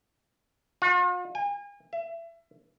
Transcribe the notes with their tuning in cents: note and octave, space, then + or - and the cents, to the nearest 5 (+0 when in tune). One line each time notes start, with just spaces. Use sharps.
F4 +45
G#5 -40
E5 +30